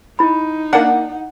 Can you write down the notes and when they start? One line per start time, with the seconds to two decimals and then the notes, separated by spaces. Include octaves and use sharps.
0.19 D#4 E4 B5
0.73 A#3 D4 F#5